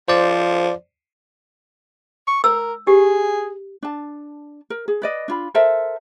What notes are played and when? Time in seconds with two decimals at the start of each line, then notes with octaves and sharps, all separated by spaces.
0.08 F3 C5 D5
2.27 C#6
2.44 A#4 E6
2.87 G4 G#4
3.83 D4 A5
4.70 A#4
4.88 G#4
5.02 B4 D5 D#5
5.28 D4 F4 B5
5.54 A4 A#4 C5 E5